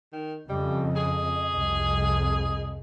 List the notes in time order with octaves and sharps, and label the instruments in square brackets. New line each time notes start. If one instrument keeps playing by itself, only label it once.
[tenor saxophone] D#3
[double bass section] F2 C#3 [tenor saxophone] G3 [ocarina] D#5
[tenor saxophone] G#4
[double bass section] C2 F2